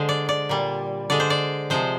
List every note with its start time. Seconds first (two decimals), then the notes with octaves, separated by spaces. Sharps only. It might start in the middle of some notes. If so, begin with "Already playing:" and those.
Already playing: D3 G#3 C5
0.09 D5
0.29 D5
0.49 A#2 G3
1.10 D3 G#3 D5
1.20 C5
1.30 D5
1.70 C3 F3 G#3 C5